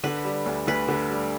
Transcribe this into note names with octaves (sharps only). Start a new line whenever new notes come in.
D3 B4
G3
D2
D2 B4
D3
G3